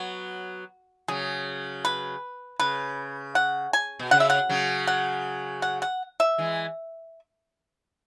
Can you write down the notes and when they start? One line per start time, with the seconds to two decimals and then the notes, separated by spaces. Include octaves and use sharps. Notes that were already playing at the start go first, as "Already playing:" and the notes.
Already playing: F#3 B3 F#4
1.08 C#3 F#3 G#4
1.85 B4
2.60 C#3 B4
3.35 F#5
3.73 G#5
3.99 B2
4.11 C#3 F#5
4.20 E5
4.30 F#5
4.49 C#3 F#3
4.87 F#5
5.62 F#5
5.82 F#5
6.20 E5
6.38 E3 G#3